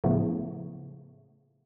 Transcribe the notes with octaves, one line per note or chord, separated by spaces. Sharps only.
A2 C#3 F3 A3 B3